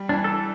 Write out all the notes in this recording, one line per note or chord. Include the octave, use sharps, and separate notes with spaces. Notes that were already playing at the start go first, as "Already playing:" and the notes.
Already playing: G3
E3 D4
A4